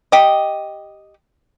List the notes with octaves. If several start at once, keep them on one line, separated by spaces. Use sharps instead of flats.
G4 D#5